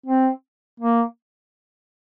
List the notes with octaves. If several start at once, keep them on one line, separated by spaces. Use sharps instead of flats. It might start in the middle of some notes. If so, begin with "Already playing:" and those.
C4
A#3